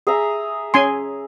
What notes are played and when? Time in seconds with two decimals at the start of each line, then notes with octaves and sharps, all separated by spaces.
0.07 G#4 E5 A#5
0.74 C#4 G#5 C6